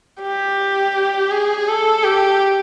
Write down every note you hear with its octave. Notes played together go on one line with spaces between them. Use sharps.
G4
G#4
A4
G4